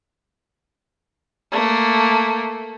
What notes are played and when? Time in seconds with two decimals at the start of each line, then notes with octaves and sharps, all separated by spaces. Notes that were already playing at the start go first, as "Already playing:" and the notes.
1.51 A3 A#3